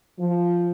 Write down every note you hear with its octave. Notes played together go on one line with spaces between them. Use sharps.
F3